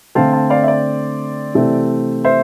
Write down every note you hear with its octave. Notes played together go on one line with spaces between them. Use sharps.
D3 A3 C4 F5 A5
F5 A5
D5 F5
E5
D5
C3 E3 A3 C4
C5 E5